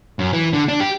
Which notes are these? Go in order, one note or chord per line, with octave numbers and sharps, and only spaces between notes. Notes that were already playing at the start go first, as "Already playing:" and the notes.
F#2
E3
D3
D4
G4